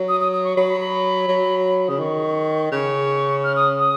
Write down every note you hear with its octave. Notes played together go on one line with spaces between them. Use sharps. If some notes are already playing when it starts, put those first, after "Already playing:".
Already playing: F#3
D#6
D#6
D#6
C#6
F#3 B5
B5
B5
F#3
B5
C#3 D#6
D#3 C#6
C#3 C#6
F6
D#6
D#6